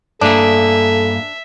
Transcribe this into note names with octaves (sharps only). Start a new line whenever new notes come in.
G2 A#3 D4 G#4 A4 E5